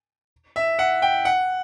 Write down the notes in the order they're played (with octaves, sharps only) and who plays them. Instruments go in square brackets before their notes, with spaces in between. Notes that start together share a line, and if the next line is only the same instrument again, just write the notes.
[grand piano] E5
F#5
G5
F#5